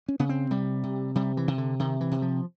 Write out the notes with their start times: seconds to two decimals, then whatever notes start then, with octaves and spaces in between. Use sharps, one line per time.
0.08 C#4
0.19 C#3 B3
0.29 C4
0.51 C3 G3
0.83 C3
1.15 C3 G3
1.37 E3
1.48 C3
1.58 D3
1.79 C3 D#3
2.01 E3
2.11 C3
2.22 F3